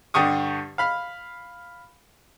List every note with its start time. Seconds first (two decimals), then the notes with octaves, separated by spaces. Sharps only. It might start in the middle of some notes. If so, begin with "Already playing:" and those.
0.14 G2 D3 G4 C#6 D#6
0.78 F5 B5 F6